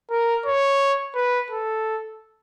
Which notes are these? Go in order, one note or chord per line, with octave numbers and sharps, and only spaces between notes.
A#4
C#5
B4
A4